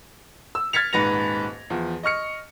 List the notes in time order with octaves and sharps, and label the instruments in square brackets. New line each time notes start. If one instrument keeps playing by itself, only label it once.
[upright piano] E6
F6 G#6 A6 B6 C#7 F7
D#1 G#2 B4 A#6 F7
E2 F3
D#5 C#6 F6 C#7